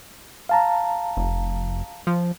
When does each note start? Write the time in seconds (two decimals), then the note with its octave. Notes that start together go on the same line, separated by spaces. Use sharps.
0.49 F5 A5 A#5
1.17 F1
2.07 F3